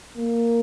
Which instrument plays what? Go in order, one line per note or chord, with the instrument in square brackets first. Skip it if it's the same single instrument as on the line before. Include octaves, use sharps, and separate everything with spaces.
[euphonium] A#3